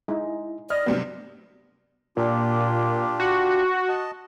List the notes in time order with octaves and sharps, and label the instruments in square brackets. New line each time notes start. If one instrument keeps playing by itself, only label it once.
[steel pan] G#3 D#4 [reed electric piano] E4
[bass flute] D5 [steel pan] D#5 [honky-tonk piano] F6
[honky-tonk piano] G2 C3 F#3 [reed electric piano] B3
[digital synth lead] A#2 [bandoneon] D4 F4 G4
[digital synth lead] F#4
[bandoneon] D#5 A5